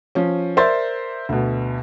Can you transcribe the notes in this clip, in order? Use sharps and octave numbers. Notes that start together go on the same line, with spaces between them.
F3 C#4
A#4 C5 D5 E5 C6 A6
D2 B2